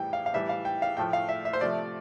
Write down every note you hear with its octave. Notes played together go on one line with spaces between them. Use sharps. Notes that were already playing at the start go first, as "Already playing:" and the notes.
Already playing: A2 E3 G3 G5
F5
F5
A2 E3 G3 E5
F5
G5
F5
A2 F3 A3 G5
F5
E5
E5
C5
C3 F3 A3 D5